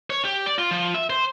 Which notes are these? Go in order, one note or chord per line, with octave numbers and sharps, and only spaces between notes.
C#5
G4
D5
F4
F3
E5
C5